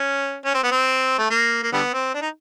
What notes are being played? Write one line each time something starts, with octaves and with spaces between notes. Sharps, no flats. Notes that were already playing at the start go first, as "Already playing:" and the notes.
Already playing: C#4
C#4
C4
B3
C4
A3
A#3
A#3
D3 G3 B3
C4
D4
D#4